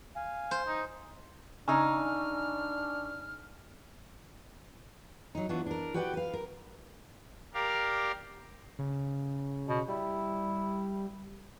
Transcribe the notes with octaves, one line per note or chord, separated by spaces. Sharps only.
F5 G#5
C5
D#4
C#3 D4 D#4 G#5 C#6 E6 F6
F#3 D#4
E3 B3 D4 F4 F#4
D4 A#4
F#4 G4 B4 D5 F#5 G5
B4 F5
A#4
G4 A#4 D5 F5
C#3
B2
G3 E4